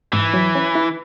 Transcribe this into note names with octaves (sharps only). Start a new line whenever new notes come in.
G#2 E3
F#3
C#4
E4